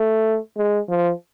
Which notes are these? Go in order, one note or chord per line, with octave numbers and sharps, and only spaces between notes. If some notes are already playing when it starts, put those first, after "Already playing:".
Already playing: A3
G#3
F3